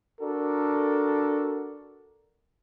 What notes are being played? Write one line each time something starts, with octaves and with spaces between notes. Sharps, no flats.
D4 F#4 A4 A#4